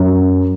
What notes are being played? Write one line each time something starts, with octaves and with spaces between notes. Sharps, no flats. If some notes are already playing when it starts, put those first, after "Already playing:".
Already playing: F#2